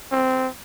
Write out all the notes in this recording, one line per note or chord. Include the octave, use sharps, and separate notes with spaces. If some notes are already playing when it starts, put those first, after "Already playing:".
C4